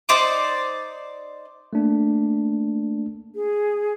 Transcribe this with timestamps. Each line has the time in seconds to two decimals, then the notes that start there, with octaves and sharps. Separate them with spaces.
0.09 D#4 C5 D5 D6
1.73 A3 A#3 D4
3.35 G#4